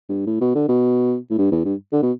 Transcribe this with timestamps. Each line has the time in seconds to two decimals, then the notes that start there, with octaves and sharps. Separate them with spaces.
0.09 G2
0.27 A2
0.41 B2
0.55 D3
0.69 B2
1.31 A2
1.38 G2
1.52 E2
1.65 G2
1.93 D3
2.03 B2